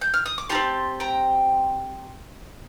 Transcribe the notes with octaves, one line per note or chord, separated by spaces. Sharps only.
G6
F6
D#6
D6
D#4 G4 A5 C6
C4
G5 A#5